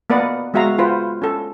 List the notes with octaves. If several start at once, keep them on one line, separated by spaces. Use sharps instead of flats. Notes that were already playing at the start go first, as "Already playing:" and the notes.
A#3 B3 B4 D5 D#5 F#5
G#3 B3 F#4 E5 F5 A#5
F4 B4 C5 F#5
C#4 A4